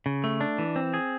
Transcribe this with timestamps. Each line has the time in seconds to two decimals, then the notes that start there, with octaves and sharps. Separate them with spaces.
0.06 C#3
0.24 A3
0.41 D4
0.58 E3
0.76 C4
0.94 G#4